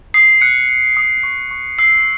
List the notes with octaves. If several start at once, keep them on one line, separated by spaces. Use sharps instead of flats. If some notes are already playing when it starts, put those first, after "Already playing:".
D#6 C7
F#6 C#7
F#6
D#6
C#6
C#6
E6 C7